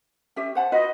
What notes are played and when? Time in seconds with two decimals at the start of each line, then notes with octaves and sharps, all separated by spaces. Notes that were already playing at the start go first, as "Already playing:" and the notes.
0.36 C#4 G4 E5
0.55 C5 F#5 A5
0.72 F4 F#4 B4 D#5